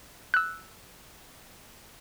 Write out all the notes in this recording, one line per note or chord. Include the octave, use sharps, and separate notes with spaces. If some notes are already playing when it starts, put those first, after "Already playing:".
E6 F#6